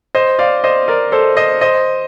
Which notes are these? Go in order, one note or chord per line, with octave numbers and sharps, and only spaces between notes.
C5 D#5
D5 F5
C5 D#5
A#4 D5
A4 C5
C5 D#5
C5 D#5